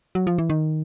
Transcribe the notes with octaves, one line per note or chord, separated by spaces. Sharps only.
F#3
F3
E3
D#3